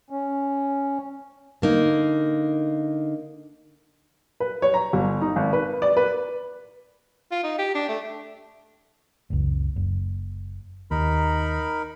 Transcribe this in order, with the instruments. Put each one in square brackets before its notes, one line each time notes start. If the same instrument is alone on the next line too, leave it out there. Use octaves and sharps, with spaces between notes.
[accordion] C#4
[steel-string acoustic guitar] D3 A#3 D#4
[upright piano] B4
C#5
A#5
G1
D#4
G#1
B4
D5
B4
[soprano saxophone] F4
D#4
G4
D4
A3
[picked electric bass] F#1 C#2
F#1
[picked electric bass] D#2 [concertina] D#4 A#4 B5